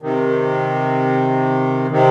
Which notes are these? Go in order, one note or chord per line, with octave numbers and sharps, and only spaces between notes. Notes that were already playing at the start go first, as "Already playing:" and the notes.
C3 D#3
C3 D#3